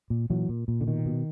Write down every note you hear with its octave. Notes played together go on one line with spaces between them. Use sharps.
A#2
A#2 E3 F#3
A#2
A#2
D3
B2 D#3
B2